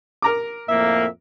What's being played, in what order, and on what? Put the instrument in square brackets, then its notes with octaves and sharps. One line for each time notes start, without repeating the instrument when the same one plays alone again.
[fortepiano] A#4 A#5 D6
[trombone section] F2 A2 A#3 [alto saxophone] E5